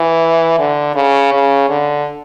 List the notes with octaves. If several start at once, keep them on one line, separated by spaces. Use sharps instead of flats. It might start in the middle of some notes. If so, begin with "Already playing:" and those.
Already playing: E3
D3
C#3
C#3
D3